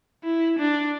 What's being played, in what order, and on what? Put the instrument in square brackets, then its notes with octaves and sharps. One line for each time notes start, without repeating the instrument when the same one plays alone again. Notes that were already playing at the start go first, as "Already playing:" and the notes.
[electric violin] E4
D4